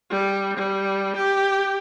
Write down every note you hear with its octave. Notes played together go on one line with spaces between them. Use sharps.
G3
G3
G4